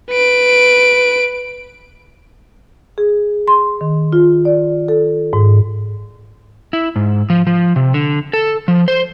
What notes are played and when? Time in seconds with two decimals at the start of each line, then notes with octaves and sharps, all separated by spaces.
0.10 B4 D7
2.98 G#4
3.48 C6
3.81 D#3
4.13 F4
4.45 D5
4.88 A4
5.33 G#2
6.73 E4
6.96 G#2
7.30 F3
7.47 F3
7.76 C3
7.94 D3
8.33 A4
8.68 F3
8.88 C5